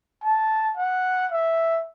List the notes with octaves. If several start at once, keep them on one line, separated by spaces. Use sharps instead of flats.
A5
F#5
E5